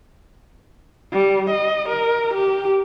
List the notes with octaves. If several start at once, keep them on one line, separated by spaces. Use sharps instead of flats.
G3
D#5
A#4
G4